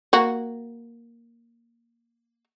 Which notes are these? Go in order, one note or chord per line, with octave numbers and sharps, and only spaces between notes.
A#3 F#4